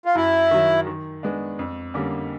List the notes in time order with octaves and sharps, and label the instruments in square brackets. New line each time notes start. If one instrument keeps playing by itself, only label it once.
[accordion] F4
[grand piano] F#2 [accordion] E4
[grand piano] D#3 F#3
D#3
G#3 B3 D4
F2
D3 G3 A#3 C#4